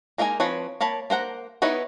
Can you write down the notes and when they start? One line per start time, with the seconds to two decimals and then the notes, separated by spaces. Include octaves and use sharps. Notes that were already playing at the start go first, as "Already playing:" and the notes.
0.18 G#3 A#3 D#4 A4 G#5
0.40 F3 C4 B4 C#5
0.81 A#3 C#5 A5 B5
1.10 A#3 C5 F#5 A#5
1.62 B3 D#4 E4 B4 C#5